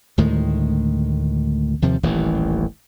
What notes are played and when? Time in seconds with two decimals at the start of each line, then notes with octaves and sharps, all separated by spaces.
0.18 D2 A2 D#3 G#3
1.82 D#2 C3 F3
2.03 D#1 A1 D#2 E3